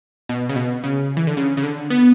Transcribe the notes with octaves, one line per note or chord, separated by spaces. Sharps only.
B2
C#3
B2
C#3
E3
D3
C#3
C#3
D3
B3